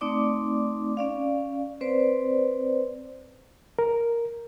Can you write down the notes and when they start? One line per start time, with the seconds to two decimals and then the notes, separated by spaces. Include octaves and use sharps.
0.01 A3 C4 D#4 D5 D6
0.97 C#4 D5 F5
1.81 C4 B4 C5 D5
3.79 A#4